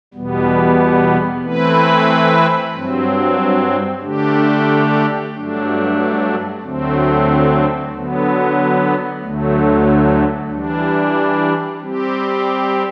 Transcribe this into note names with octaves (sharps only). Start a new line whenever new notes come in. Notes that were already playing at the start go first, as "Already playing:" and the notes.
E2 B2 G3 B3
E3 A3 C4 E4 B4
G2 F#3 C4
D3 A3 D4 G4
G2 F#3 A3 D4
D2 D3 F#3 A3 C4
D3 F#3 B3
D2 D3 F#3 A3
E3 G3 D4
G3 C4 G4